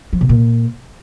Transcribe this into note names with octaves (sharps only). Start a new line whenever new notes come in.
F3
B2
A#2